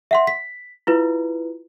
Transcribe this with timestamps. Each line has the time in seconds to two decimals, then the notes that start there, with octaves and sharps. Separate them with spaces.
0.11 E5 F#5 C6
0.27 B6
0.87 E4 F4 B4